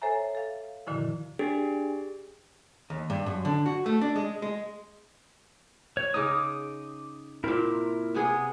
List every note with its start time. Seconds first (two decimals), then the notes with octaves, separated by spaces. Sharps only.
0.02 A4 C5 C#5 E5 G#5 A#5
0.35 A4 F5
0.87 F#2 A#2 D3 D#3 F3 E4
1.39 D4 G4 G#4
2.90 D#2
3.10 G2
3.26 F#2
3.45 D3
3.66 F#4
3.86 A3
4.01 D4
4.16 G#3
4.42 G#3
5.97 C#5
6.14 C#3 D#4 D6 D#6
7.44 A#2 C4 E4 A#4
8.15 C3 B3 G#4